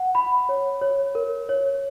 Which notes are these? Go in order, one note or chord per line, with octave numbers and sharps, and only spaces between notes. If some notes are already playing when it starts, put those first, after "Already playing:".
Already playing: F#5
B5
C#5
C#5
A#4
C#5